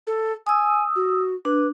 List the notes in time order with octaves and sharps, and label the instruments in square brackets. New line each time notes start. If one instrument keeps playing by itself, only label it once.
[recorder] A4
[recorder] G#5 [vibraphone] D#6 E6
[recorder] F#4
[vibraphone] D4 [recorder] B4